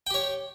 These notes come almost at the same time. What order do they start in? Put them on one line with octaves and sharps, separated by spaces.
G5 G4 C#5